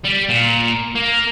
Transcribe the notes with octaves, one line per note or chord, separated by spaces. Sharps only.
G3
A#2
A#3